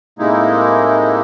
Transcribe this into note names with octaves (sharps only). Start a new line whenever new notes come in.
A2 C3 G#3 A#3 D#4 E4